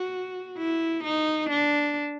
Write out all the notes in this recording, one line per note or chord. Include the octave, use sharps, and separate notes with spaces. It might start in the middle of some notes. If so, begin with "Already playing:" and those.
Already playing: F#4
E4
D#4
D4